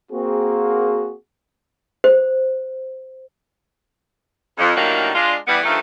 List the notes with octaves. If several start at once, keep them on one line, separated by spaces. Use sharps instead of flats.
A#3 C4 F#4 G#4
C5
F2
A2 D3 D#3 F#3 G3 A#3
G#3 D4 F4
E3 G3 B3
G2 D#3 F3 A3